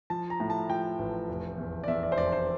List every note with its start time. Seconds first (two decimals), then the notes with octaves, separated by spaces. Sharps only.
0.10 F3 A5
0.30 A#5
0.40 A2
0.50 A5
0.69 F3 G5
0.99 A1
1.28 F1
1.58 E2
1.84 D5
1.88 E2 E5
2.03 D5
2.12 C5
2.18 F1 D5
2.32 C5